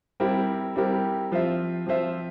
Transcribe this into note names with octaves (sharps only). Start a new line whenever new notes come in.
G3 C4 E4 G4 A#4
G3 C4 E4 G4 A#4
F3 C4 F4 C5 E5
F3 C4 F4 C5 E5